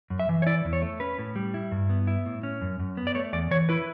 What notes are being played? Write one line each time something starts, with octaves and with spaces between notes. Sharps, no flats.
F#2
E5
E3
C#5
E4 D5
E2
C#5
A3
C#4 B4
A2
G3
E4
G2
B3
E4
A2
C#4
F#2
F#2
B3
D5
A3 C#5
E2 D5
E3 C#5
E4 B4